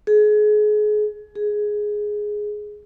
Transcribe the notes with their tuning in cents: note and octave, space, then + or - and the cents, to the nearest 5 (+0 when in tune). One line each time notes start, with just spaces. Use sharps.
G#4 +30
G#4 +5